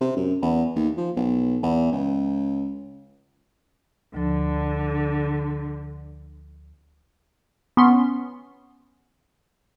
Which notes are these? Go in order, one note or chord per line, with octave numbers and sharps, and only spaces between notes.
C3
F#2
E2
D#2
F3
B1
E2
C#2
D2 D3 F3
B3 C#4 C6